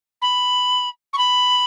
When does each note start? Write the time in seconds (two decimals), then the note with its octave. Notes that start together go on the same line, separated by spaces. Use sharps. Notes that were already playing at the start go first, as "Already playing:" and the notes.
0.22 B5
1.13 C#6
1.18 B5